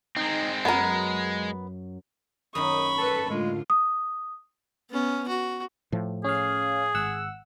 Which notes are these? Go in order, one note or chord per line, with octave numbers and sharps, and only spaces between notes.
G#3 C4 D#4
F#2 G#3 B3 A#4
F#2 D#3 D#4 B5 C#6 D#6
A4 B4 A5
A2 D3 G#3 F4
D#6
B3 C#4
F#4
A2 F3
C#4 G#4 F5
G#1 F#5 E6